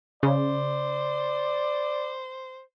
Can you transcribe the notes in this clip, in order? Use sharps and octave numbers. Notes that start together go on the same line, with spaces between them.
C#3 C5 D5